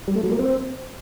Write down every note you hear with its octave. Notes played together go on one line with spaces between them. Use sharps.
G3
A3
F#3
A#3
C4